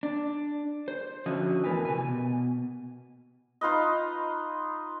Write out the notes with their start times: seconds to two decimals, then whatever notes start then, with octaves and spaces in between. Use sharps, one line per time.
0.03 D4
0.88 C5
1.26 D3 F3 C#4 F#4 D#5 E5
1.64 E2 A2 F3 A#4 B4 G#5
1.85 C3 G#5
2.07 B2
3.61 D#4 F4 B4 D#5